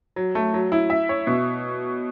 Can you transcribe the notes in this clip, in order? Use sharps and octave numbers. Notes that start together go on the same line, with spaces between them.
F#3
A3
F#3
E4
E5
C#5
B2